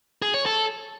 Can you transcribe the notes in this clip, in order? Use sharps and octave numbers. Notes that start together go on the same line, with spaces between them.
G#4
C#5
A4